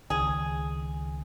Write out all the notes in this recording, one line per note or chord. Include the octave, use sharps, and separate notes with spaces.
C#2 D#3 C4 G#4